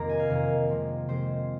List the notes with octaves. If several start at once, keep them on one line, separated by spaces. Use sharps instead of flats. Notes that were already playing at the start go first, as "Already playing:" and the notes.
Already playing: F2 C3 D#3 A#3 A#5
G#5
F5
F2 C3 D#3 A#3
C3 F3 G#3 C4
C3 F3 G#3 C4 C5